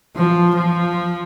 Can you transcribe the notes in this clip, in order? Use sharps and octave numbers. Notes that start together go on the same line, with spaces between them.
F3
F3